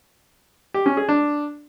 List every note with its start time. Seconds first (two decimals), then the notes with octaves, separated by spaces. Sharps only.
0.74 G4
0.86 C#4
0.97 G#4
1.09 D4